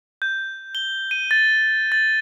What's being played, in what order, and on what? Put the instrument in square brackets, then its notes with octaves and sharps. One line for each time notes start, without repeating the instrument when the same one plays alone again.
[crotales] G6
G7
D#7
A6
A6